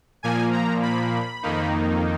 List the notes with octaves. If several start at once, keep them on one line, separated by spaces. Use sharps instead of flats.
A#2 F3 A#3 G#5
A#5
B5
F2 D#3 A#3 D#4